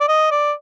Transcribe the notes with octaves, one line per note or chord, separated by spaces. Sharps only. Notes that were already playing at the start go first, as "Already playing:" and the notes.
D5
D#5
D5